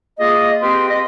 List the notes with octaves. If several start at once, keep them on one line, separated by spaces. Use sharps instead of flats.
A#3 F4 G#4 D#5
C4 G4 B4 F5 C6
D#5